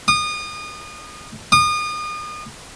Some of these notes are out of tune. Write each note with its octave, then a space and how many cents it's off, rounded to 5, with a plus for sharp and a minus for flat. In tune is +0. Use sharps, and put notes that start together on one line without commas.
D#6 -30
D#6 -35